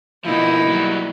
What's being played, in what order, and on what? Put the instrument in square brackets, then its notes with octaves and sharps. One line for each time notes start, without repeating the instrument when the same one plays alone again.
[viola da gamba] B2 A#3 D#4 [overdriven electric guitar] D3 F3 [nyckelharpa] E4
[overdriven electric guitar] F#3 G3